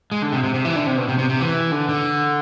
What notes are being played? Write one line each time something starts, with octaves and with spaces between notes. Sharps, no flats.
G#3
D3
C3
C3
C3
E3
D3
C3
B2
C3
C3
C3
E3
D3
D3